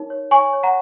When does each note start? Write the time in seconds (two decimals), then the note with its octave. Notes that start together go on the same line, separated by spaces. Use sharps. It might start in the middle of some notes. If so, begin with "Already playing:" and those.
Already playing: D#4 A#4 C#5
0.10 C#5
0.31 C#5 G#5 C#6
0.53 C#5
0.63 F#5 A#5